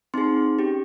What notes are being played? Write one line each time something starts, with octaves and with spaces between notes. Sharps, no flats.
C4 D#4 G#4 C6
C#4 G4